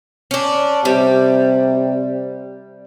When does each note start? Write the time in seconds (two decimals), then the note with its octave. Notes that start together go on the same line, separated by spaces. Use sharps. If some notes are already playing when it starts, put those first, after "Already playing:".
0.31 C#4 D4
0.85 C3 G3